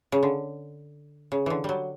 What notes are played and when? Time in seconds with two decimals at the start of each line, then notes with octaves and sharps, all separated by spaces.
0.12 C#3
0.23 D3
1.32 C#3
1.46 D3 E3
1.64 F#3 G3